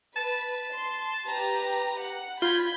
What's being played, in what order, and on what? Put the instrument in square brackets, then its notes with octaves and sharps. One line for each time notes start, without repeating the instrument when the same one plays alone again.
[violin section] B4 [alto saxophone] A5
[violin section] C6
G4 B4 A#5
F#5
[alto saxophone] F4 [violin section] B5 G6 G#6